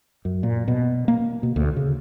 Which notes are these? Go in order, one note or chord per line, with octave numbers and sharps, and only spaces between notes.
F#2
A#2
B2
A#3
B2
D2
C#3